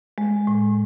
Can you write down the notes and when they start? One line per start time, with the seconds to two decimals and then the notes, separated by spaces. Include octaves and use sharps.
0.18 G#3
0.47 A2